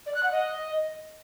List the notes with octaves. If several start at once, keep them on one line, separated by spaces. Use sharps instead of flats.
D5
F#6
F#5
D#5